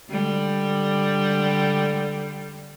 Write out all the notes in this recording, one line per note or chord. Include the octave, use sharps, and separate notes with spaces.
D3 G3